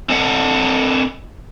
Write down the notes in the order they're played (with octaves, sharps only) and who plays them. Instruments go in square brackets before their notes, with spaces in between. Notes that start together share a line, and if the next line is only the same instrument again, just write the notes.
[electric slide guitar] C4 D4 A4 D#5 F#5